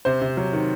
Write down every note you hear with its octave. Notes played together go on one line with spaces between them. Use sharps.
C3 C5
C3
F#3
D#3